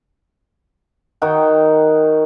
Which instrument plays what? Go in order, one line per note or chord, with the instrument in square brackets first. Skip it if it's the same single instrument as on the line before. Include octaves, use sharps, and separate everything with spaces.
[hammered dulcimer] D#3 D#4 F#4 G5